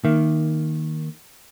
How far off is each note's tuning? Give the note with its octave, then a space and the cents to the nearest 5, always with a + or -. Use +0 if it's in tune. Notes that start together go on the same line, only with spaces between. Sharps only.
D#3 +0 A#3 +0 E5 +20